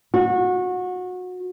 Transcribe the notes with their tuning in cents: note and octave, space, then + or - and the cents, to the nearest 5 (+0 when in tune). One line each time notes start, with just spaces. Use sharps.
F#4 -25